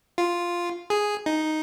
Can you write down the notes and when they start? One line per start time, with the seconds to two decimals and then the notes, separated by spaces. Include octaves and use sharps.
0.18 F4
0.90 G#4
1.26 D#4